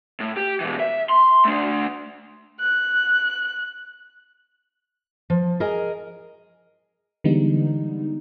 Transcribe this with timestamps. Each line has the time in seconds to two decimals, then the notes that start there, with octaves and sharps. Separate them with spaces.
0.20 A2
0.37 G4
0.61 B2 E3
0.80 E5
1.09 C6
1.45 A3 D4
2.60 F#6
5.30 F3
5.60 G#4 A#4 D#5 G#5
7.24 D3 E3 G3 G#3 B3 D#4